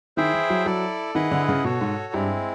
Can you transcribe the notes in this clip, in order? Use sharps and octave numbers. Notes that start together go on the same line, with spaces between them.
D#3 E4 G#4 C5 E5 G5
E3
F#3
F#3 E4 A4 D5
D#3 E4 G#4 B4 D#5 F#5
D3
C#3
B2 F#4 A4 C#5
G#2
G2 G#3 C4 E4